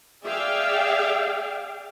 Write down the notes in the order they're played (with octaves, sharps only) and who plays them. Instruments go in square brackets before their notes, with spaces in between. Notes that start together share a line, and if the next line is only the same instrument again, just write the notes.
[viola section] G#4 D5 E5 F5 G5